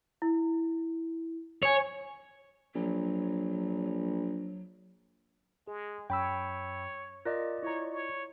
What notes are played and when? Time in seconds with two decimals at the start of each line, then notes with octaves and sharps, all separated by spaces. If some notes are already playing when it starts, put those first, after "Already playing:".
0.22 E4
1.63 C#5 G#5 C#7
2.75 A#1 F#3
5.67 G#3 G#4
6.10 F#2 C#5 G5 B5 E6
7.25 F4 A#4 D5 D#5 A#6
7.63 E4 C#5 A#5
7.92 C#5